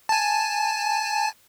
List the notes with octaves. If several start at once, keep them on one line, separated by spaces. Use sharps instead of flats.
G#5 A5